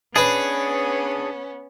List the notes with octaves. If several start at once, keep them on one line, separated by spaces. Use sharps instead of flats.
B3 C#4 D4 G#4 B4 D#5